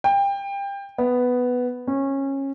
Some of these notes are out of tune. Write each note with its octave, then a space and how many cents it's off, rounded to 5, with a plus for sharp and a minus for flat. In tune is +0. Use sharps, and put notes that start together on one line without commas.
G5 +25
B3 +5
C#4 -20